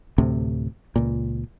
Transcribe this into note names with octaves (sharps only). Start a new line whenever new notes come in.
D2 A2 C3
C#2 A#2